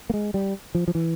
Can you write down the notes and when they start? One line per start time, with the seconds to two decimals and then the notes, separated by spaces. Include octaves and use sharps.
0.10 A#3
0.14 G#3
0.34 G3
0.75 F3
0.88 F3
0.95 E3